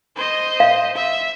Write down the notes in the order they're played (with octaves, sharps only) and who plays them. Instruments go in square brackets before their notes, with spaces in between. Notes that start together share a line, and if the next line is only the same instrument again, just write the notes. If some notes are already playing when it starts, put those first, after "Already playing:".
[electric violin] C5 D#5
[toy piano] F5
[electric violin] E5